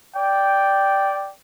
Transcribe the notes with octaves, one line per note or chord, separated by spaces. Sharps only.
D5 G5